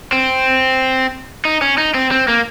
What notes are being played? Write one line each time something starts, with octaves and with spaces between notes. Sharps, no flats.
C4
D#4
C#4
D#4
C4
C4
A#3